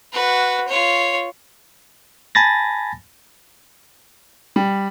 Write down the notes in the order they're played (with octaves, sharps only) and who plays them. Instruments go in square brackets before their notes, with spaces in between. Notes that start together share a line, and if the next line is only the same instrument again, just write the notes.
[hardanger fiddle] F#4 B4
F4 C#5
[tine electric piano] G#5 A5 B5 A6 A#6
[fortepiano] G3